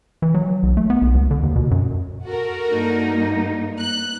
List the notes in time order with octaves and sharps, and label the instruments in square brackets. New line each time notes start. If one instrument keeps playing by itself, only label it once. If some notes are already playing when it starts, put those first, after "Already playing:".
[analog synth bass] E3
F#3
B1
A3
B3
B1
C#2
D3
D#2
B2
F#2
[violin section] F#4 A4 A#4
[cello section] G2 A#3 D#4
[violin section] F#6